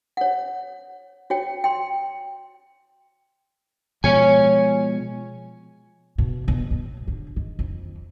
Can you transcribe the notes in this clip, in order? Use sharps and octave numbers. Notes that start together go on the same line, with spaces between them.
C#5 F#5
F#4 C#5 G5
G5 C6
B2 F3 G#3 C#5 G#5
B2
B2
A2
D3
D#3
F2